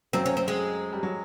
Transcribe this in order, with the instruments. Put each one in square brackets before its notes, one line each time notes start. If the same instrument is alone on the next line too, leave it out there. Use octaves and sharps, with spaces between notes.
[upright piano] F#2 F#3 [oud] C4
[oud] C#4
C4
G#3
[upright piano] G3
F#3